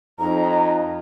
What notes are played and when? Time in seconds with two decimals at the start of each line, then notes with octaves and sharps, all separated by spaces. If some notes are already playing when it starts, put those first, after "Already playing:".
0.19 F2 D#4 A#5